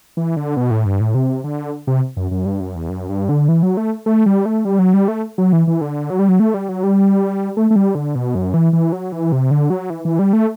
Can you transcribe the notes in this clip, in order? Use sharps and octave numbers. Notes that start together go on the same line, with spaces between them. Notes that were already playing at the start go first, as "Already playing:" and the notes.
E3
D3
B2
A2
G2
A2
C3
D3
C3
F#2
F#2
G2
F#2
E2
F#2
G2
D3
E3
F#3
A3
A3
G3
A3
G3
F#3
G3
A3
F#3
E3
E3
D3
F#3
G3
F#3
A3
G3
F#3
G3
A3
A3
G3
D3
B2
F#2
E3
E3
F#3
E3
C3
D3
F#3
E3
E3
G3
A3